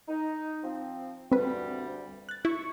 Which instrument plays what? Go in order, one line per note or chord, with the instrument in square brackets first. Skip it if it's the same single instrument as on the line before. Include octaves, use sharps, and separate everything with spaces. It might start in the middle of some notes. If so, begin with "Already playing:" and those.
[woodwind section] D#4
F3 C4
[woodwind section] D2 G2 G3 [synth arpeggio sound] C4 B4
[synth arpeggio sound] F#6 A6
[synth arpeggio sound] E4 [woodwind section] C#6